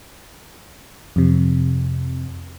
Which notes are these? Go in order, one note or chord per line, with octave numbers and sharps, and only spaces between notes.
F2 C3